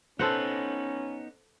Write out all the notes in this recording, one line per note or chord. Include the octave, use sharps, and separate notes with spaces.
B3 C#4 D#4 A4 B4 C5 F#5